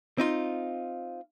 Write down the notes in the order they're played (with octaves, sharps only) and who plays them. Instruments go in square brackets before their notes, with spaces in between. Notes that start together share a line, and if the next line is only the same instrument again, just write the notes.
[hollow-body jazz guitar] C4 D#4 F4